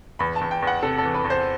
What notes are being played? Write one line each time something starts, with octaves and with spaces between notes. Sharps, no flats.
E2 B5
A5
E2
G5
E2
F#5
C3 A4
E3 A4
B4
E2
C5